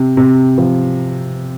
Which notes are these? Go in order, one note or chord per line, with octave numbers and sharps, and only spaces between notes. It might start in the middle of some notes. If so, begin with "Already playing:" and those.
Already playing: C3
C3
F3